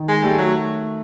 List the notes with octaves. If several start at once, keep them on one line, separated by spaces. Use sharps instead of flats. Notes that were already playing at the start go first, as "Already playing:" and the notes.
Already playing: D#3
G#3
G3 A3
F#3